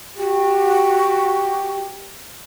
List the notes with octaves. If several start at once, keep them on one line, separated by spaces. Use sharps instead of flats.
F#4 G4